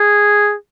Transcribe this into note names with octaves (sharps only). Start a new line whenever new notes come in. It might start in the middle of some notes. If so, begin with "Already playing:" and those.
Already playing: G#4